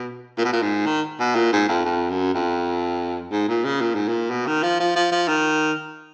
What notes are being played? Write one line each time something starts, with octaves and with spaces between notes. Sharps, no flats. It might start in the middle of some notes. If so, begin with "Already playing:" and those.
Already playing: B2
A#2
B2
A#2
G#2
D#3
B2
A#2
G#2
F2
F2
F#2
F2
G#2
A#2
C#3
A#2
G#2
A#2
B2
D#3
F3
F3
F3
F3
D#3